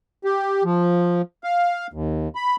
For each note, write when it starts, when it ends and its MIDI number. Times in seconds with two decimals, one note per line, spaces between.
0.24 0.63 67
0.64 1.22 53
1.44 1.87 77
1.93 2.29 39
2.35 2.56 83